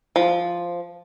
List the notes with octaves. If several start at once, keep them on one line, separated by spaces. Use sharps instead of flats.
F3